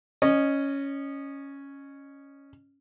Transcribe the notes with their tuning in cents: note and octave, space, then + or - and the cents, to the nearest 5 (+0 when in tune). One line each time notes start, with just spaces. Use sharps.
C#4 +0 D#5 -25